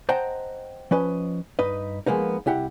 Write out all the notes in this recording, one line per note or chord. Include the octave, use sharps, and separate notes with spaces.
C5 D#5 F#5 G5 A5 A#5
F3 C#4 B4 D#5
G2 D#4 B4 D#5
F3 G#3 A#3 B3 D#4
C2 E4 G4 F#5